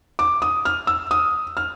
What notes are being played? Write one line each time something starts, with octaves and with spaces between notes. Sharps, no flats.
D6
D#6
F6
E6
D#6
F6